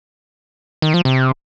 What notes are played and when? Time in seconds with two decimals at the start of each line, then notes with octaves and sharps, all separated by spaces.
0.82 D#3
0.94 F3
1.05 C3